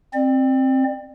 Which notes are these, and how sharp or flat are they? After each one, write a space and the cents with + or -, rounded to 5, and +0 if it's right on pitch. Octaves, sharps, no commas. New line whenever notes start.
C4 +15 D5 +30